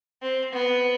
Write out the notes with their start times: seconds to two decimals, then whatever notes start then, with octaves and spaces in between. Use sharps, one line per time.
0.22 C4
0.53 B3